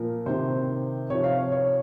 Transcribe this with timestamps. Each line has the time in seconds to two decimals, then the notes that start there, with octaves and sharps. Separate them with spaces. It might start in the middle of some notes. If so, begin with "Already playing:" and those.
Already playing: A#2 F3 A#4
0.26 C3 D#3 C5
1.10 C3 F3 C#5
1.24 F5
1.38 C#5
1.52 C#5